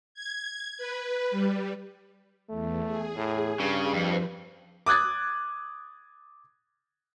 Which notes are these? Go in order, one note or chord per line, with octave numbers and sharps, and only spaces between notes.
G#6
B4
G3
E2 A3
G#4
A2
G2 C#3
F2 F3 B4 C5
D6 D#6 F#6 G#6 A6